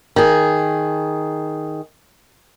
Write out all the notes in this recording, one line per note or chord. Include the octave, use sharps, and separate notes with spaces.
D#3 G#4